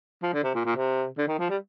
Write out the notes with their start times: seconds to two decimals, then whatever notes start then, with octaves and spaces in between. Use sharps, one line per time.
0.23 F3
0.34 D3
0.43 C3
0.54 A#2
0.65 A#2
0.76 C3
1.18 D3
1.28 D#3
1.39 F3
1.50 G3